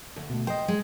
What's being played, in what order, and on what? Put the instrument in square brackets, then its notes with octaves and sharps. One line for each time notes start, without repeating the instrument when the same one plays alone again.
[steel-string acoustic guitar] D2
[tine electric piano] B2 A3
[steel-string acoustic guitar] C5 [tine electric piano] D#5 G5
[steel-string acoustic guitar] G#3